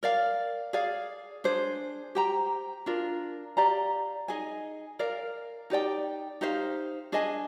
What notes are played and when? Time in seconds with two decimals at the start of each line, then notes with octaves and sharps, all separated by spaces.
0.03 A#4 D5 F5
0.73 G#4 D5 F5
1.44 D4 G#4 C5
2.15 G4 C5 G5 A#5
2.86 D4 F4 A#4
3.57 G4 D5 F5 A#5
4.28 D#4 G#4 D#5 G#5
4.99 A#4 D5 F5
5.70 D#4 G4 D5 G5
6.41 D#4 G4 C5 F5
7.12 D4 G#4 D#5 G#5